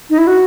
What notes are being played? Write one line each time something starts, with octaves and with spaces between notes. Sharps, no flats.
D#4
E4
F#4